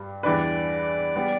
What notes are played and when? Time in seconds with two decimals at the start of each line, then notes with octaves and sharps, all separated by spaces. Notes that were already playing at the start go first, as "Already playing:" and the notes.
Already playing: G2 G3
0.23 E2 E3 G3 D4 B4 D5
1.16 G3 B3